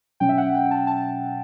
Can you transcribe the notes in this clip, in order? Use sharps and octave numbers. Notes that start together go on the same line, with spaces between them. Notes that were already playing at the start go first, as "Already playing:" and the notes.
B2 F#3 C#4 G5
E5
F#5
G5
A5
A5